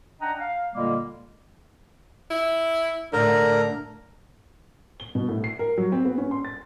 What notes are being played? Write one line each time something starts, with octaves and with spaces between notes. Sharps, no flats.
D4 D#5 F#5 G5 A#5
F5
A#2 D3 G3 G#3 A#3
E4
A2 D3 D4 A#4
G7
B2
A2
C7
A#4
F#3
C4
B3
C#4
C6
A6